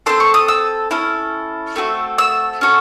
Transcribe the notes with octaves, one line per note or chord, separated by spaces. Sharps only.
C4 D#4 A4 C6
C#6
D#6
E6
C#4 E4 A4
A3 C4 F#4 A4
E6
C#4 F#4 A4